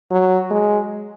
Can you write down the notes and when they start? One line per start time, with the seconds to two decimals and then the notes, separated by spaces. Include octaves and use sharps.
0.11 F#3
0.51 G#3